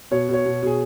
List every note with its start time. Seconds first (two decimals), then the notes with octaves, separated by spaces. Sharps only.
0.11 B2 C#5
0.28 B2 C#5
0.45 B2
0.62 B2 G#4